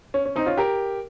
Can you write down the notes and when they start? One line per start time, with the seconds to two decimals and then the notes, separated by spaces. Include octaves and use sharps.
0.14 C#4
0.25 C#4
0.36 C4 D#4
0.46 C#4 F4
0.57 G4 A#4